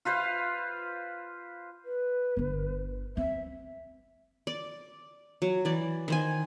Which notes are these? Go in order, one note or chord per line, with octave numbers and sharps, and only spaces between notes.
F4 B4 C5 F5
B4
G1 D3
C4 E5
D5
F#3
E3 D5
D#3 C5 G#5